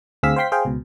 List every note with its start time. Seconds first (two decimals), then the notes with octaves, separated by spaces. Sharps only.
0.23 D2 C4 G#4 F5 E6 B6
0.36 C5 F5 G5 C6 B6
0.52 G#4 C5 F5 G5
0.65 C#2 B2